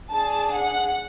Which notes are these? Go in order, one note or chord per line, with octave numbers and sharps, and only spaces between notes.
D4 G#4 A5
F#5